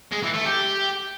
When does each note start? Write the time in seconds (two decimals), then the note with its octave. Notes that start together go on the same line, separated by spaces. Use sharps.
0.12 G#3
0.23 E3
0.34 A3
0.45 G4